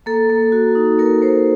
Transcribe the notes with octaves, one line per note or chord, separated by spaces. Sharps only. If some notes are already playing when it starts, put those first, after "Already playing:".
A#3 A4
A#3
F#4
D#4
A#3 A#4
A#3 C5